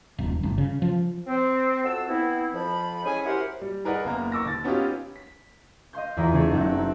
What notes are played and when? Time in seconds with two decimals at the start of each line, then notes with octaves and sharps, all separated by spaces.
0.18 D#1
0.43 G1
0.58 C#3
0.82 F3
1.27 C4
1.84 F2 F#4 A5 E6
2.08 B3 C4 E4
2.53 F2 F3 B5
3.04 G#3 C#4 E4 G#4 G#5
3.25 E4 F#4 G4 A#4 C5 F#5
3.61 G3
3.85 G#4 A#4 B4 D5 D#5 F#5
4.05 F#1 A#3 B3 A#5
4.32 C#6 D6 E6 A#6
4.46 D#2 A6
4.64 B3 C#4 D#4 F4 G4
5.15 B6
5.93 D#5 F5 C6 G6
6.17 E2 E3 E4 F4 A#5 D#6
6.32 C#3 A3 B3 D#4 G#4 A4
6.51 F#1 F#3 D#4 G4 E5 F#6
6.71 F#3 C4